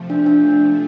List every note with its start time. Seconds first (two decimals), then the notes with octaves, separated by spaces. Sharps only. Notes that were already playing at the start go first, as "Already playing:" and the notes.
Already playing: C3 F3 A3
0.10 D4
0.26 D4